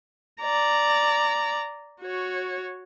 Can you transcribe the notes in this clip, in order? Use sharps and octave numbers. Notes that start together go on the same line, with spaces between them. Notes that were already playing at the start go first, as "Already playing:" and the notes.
D5 A#5
F#4 C#5